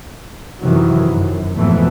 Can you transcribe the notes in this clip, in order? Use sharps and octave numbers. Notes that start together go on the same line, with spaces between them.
F#2 C3 D#3 E3 F#3
F#2
F2 G#2 B2 E3 A3